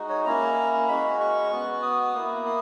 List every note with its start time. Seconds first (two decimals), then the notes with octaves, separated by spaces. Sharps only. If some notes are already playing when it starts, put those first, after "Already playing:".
Already playing: G#3 D#4 F#4
0.09 C#5
0.25 A#3 C#4 E4 A#5
0.88 G#3 C#4 F#4 B5
1.20 C#6
1.52 B3 F#4
1.83 D#6
2.14 A#3 E4
2.46 D#6